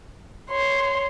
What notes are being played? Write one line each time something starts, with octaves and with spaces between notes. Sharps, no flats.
C#5 C6